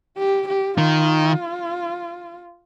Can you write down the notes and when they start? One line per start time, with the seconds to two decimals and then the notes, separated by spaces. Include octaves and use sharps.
0.18 G4
0.48 G4
0.78 D#3 F4